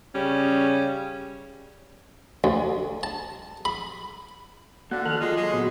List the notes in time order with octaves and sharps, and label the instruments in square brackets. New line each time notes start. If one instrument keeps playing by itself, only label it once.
[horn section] C#3 G3 C#4
[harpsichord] D2
A5
B5
[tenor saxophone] D3 [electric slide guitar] A#3 D5 [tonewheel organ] F#4 F#5
[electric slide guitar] D#3 F3 [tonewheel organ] A4 F6 F#6
[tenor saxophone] G#3 [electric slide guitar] F4 [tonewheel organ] C6
[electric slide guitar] F#3 [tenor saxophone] G#3
[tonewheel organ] A#2 F#3 F#4 [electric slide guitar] B3